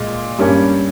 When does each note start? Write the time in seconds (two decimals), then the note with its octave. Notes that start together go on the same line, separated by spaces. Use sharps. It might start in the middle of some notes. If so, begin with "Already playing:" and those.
Already playing: A#2 G#3
0.38 G2 G3 A#3 C#4